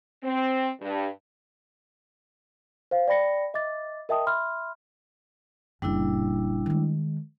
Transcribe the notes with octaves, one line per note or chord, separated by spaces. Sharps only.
C4
G2
C5 F5
D5 G5 B5 A#6 C#7
D#5 E5 D6 A6
A#4 D#5 E5 G5 A5 D#6
E5 B5 C6 F6
F#1 A#2 G3 D4 E4
D#3 G#3